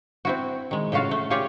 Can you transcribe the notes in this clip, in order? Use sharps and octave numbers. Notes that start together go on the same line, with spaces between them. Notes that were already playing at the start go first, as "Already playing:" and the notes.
C4 E4 F#4
D#3 G#3
A2 C#3 F4 F#4 F5
A3
F4 G4 G#4 C#5 D5